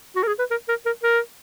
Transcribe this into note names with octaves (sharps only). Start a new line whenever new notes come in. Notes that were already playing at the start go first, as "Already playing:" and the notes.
F#4
A#4
G#4
B4
A#4
A#4
A#4
A#4